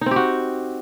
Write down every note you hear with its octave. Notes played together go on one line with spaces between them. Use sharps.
C4 D#4 F#4 G4